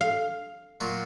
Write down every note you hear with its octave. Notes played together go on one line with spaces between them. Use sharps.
F5
A#2 F#3 F4